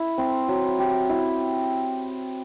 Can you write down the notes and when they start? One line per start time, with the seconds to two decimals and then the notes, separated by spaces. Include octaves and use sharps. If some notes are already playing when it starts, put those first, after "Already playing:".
Already playing: E4
0.18 C4
0.48 F#3
0.79 G4
1.09 E4